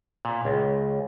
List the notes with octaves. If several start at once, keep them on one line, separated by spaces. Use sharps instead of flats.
A#2
C#2